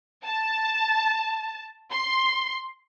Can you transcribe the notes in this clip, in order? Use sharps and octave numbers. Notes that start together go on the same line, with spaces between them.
A5
C6